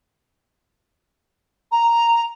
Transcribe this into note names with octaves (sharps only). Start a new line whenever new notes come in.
A#5